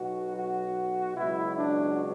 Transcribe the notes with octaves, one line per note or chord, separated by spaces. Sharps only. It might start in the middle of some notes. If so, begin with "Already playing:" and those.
Already playing: B1 B2 F#3 F#4
F#4
C#2 B2 F#3 E4
D4